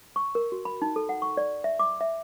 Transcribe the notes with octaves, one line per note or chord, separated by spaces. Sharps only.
C#6
A#4
F#4
B5
D#4
A4
F#5
C#6
D5
E5
D6
E5